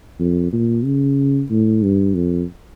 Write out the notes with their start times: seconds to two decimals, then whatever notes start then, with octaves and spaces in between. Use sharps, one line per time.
0.19 F2
0.53 A#2
0.85 C#3
1.50 A2
1.83 G2
2.15 F2